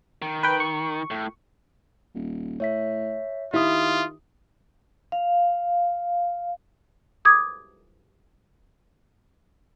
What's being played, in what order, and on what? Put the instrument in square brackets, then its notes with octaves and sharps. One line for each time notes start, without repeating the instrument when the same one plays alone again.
[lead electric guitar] D#3
[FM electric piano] B4 G5
C#6
[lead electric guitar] A2
[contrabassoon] D#1
[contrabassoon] A2 [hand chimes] C#5 E5 B6
[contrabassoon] D#3 [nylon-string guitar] E4 [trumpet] F4 [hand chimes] G4 D#6
[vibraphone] F5
[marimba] D6 D#6 G#6